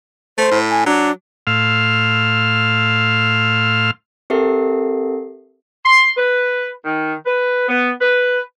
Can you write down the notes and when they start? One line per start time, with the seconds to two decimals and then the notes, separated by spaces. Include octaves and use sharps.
0.38 A3 C5
0.51 A2
0.71 G#5
0.86 F#3 D4
1.47 A2 F5 C6 E6 F6
4.30 C4 G4 A4 A#4 E5 C7
5.85 C6
6.17 B4
6.85 D#3
7.25 B4
7.69 B3
7.99 B4